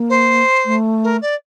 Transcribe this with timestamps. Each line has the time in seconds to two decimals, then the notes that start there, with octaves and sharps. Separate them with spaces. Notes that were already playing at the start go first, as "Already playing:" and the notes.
Already playing: A#3
0.09 C5
0.65 A3
1.04 A#4
1.22 D5